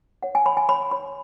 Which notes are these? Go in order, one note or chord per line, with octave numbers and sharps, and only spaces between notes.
C#5 F#5
G#5
C#5 B5
G#5
C#5 B5
C#5 B5